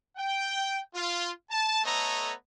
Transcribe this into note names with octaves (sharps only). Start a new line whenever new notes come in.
G5
F4
A5
A3 B3 A4 C#5 D#5 A#5